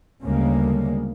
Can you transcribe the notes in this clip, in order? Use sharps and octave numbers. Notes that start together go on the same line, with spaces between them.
D2 C#3 G3 G#3 A#3